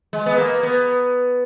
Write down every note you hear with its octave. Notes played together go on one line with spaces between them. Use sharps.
G#3
B3
A#3
B3